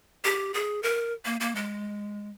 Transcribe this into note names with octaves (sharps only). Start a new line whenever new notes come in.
G4
G#4
A#4
A#3
A#3
G#3